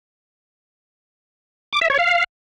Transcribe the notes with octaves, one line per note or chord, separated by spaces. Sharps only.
D6
E5
C#5
F5